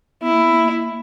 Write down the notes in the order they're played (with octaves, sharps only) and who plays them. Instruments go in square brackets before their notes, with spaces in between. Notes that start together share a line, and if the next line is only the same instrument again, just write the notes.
[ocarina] B3 [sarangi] E4
[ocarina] A#3
B3
A#3